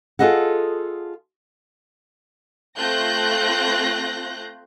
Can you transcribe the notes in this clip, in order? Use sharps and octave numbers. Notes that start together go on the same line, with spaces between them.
F4 F#4 G#4 A4 D#5 F#5
A3 C4 F4 F#6 G6 A#6